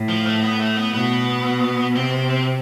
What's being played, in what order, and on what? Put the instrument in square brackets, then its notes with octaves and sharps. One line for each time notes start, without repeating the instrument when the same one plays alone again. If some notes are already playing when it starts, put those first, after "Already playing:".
Already playing: [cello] A2
[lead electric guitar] F3
A3
B3
A3
B3
[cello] B2 [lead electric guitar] B3
[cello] C3 [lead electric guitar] C4